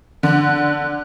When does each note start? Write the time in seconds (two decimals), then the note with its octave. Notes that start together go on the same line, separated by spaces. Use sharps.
0.23 D3 F#6